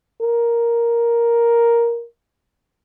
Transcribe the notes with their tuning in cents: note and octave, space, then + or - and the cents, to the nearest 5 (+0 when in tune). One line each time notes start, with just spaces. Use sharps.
A#4 +5